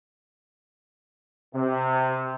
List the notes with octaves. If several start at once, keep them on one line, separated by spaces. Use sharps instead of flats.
C3